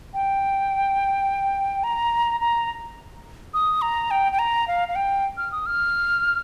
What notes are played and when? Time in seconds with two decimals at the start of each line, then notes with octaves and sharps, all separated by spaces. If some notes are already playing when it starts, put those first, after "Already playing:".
0.14 G5
1.84 A#5
2.40 A#5
3.54 D#6
3.82 A#5
4.11 G5
4.32 G5
4.39 A#5
4.68 F5
4.89 F5
4.96 G5
5.37 F6
5.52 D#6
5.66 F6